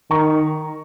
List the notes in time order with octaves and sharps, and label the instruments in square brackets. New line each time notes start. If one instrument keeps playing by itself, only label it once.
[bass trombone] D#3 [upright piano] A#5 C#6